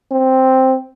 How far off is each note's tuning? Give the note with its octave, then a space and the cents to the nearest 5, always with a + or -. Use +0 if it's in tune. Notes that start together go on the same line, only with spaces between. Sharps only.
C4 +0